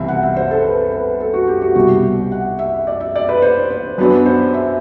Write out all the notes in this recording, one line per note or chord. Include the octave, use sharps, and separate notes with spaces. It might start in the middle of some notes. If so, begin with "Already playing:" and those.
Already playing: C2 C3 E3 B3 E5
F#5
E5
C5
A4
B4
B4
A4
F#4
G4
F#4
C2 B2 G3 F#4
G4
F#5
E5
D5
E5
D5
B4
C5
C5
F#2 F#3 B3 D4 B4
C5
E5